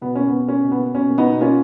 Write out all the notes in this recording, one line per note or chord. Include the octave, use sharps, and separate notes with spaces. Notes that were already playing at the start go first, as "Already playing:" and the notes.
B2 B3
A#3 C#4
B2 B3
A#3 C#4
B2
B3
A#3
B2 C#4
A#3
B3 D#4
B2
A#3 C#4 F4